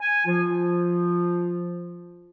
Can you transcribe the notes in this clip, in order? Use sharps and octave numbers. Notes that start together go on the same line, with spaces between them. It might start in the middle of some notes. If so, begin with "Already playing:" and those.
G#5
F3 F4